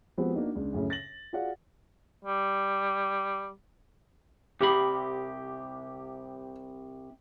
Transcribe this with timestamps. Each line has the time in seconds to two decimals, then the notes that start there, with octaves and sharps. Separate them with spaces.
0.18 F3 G#3 B3 C4 F#4 G4
0.34 A#3 D4 D#4 F#4
0.55 C#2 D4
0.73 F#2 A2 C#3
0.90 A6 A#6 F#7
1.33 F4 F#4 G#4 D5 F5 F#5
2.24 G3
4.61 C2 C3 G4 B5